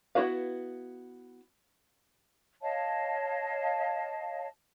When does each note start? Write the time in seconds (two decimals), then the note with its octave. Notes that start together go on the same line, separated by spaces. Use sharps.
0.15 B3 E4 F#4 B4 F5
2.62 C#5 D#5 F5 A5